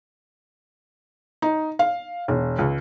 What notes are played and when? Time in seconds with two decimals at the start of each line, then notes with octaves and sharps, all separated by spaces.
1.42 D#4
1.79 F5
2.28 E1
2.59 C#2